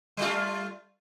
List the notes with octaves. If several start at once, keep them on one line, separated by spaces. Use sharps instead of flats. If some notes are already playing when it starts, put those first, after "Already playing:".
G3 A3 F4